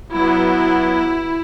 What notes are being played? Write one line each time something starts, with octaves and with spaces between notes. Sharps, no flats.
F#3 B3 E4